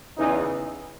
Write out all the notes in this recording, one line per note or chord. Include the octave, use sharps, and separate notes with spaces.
E2 C#3 E3 D#4